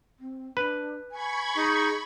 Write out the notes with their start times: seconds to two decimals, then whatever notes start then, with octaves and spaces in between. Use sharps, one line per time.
0.19 C4
0.57 D4 B4
1.11 G#5 B5 C#6 G#6
1.55 D#4 G#4